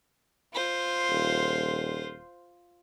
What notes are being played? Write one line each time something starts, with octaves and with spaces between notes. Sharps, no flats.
F4 C5
D#1